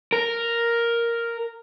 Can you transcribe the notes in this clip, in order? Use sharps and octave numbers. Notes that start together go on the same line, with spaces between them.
A#4